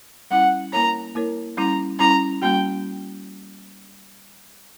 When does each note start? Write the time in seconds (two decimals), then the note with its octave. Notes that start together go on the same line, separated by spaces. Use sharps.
0.31 G3 C#4 E4 F#5
0.73 A#3 E4 A#4 C#5 A#5
1.15 A#3 E4 A#4 C#5
1.57 G3 C#4 E4 A#5
1.99 G3 C#4 E4 A#5
2.42 G3 A#3 C#4 F#4 G5